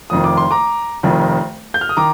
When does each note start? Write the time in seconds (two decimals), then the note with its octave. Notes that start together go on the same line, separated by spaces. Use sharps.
0.10 F1 F2 D#3 D#6
0.24 D6
0.37 C6
0.51 A#5 D6
1.03 F1 F2 D#3
1.74 G6
1.81 F6
1.89 D#6
1.97 D#3 A#5 D6